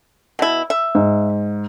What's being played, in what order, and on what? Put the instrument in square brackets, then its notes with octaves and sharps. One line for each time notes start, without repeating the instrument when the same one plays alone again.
[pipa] B2 E4
E5
[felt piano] G#2